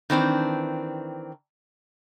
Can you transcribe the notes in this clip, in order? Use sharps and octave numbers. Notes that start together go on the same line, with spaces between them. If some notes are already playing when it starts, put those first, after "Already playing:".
D#3 E3 C4 D4